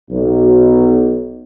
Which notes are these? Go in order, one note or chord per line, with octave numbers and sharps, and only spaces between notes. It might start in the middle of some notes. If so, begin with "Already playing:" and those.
B1